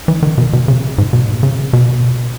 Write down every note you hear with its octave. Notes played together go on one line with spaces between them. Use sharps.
E3
D#3
B2
B2
C#3
G#2
B2
C#3
B2